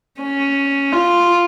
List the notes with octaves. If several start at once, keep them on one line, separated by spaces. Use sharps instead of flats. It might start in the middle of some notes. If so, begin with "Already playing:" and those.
C#4
F4